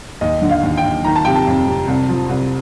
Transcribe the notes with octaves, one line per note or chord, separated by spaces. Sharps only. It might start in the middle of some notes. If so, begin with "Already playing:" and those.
D#2 D#5
D3
F5
D#2
G5
D#2
D#3 A#5
A5
C3 G5
A5
F2
C3
C2
F3
C2